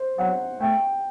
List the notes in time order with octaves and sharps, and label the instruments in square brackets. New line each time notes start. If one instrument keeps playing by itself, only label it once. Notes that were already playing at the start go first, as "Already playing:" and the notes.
Already playing: [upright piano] C5
[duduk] F#3 [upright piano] F#5
[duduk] A3 [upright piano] G5